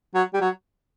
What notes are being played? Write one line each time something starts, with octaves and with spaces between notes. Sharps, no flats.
F#3
G3
F#3